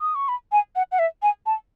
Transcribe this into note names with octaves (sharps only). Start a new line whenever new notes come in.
D#6
C#6
B5
G#5
F#5
F#5
E5
G#5
A5